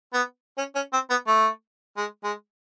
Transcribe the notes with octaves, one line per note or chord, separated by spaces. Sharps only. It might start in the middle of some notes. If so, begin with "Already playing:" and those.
B3
C#4
C#4
C4
B3
A3
G#3
G#3